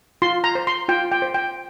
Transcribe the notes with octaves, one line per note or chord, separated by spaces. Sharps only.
F4 C6
A#5
C5
C6
F4 G5
G5
C5
G5